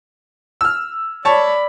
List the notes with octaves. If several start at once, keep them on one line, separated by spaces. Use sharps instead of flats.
E6 F6
C#5 D5 A5 B5